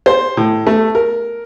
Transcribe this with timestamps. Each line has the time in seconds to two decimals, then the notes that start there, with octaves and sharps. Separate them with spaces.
0.06 C5
0.37 A2
0.67 A3
0.95 A#4